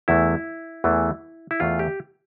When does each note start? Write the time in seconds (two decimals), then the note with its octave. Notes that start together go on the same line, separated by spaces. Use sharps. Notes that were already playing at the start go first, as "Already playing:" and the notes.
0.08 E2 E3 A3 E4
0.84 E2 E3 A3
1.51 E4
1.60 E2 E3 A3 F4
1.79 G4